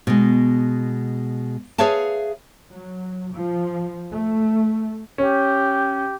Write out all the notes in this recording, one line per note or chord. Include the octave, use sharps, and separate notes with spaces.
B2 G#3
G#4 B4 C#5 E5 F5 A5
F#3
F3
A3
C#4 G4